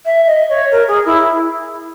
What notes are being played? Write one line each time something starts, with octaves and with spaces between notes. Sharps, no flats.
E5
D#5
C#5
A#4
G#4
E4